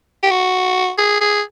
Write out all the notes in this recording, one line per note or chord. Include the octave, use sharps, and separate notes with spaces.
G4
F#4
G#4
G#4